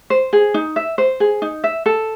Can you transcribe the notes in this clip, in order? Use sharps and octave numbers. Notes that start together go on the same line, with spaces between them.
C5
G#4
D#4
E5
C5
G#4
D#4
E5
A4